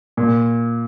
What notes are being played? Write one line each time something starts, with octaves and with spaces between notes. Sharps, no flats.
A#2